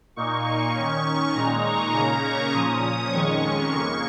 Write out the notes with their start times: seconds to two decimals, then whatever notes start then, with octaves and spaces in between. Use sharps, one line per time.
0.16 A#2 A#3 D#4 C#6
0.46 C#6
0.75 D#3 C#4
1.35 A#2 G#3 D#4 A#5
1.65 C#6
1.94 C#3 A#3 C#4 A#5
2.24 C#6
2.53 A#2 F3 C#4 D#6
3.12 F2 D#3 G#3 C#4 C#6
3.71 F2 C#3 A#3 C#6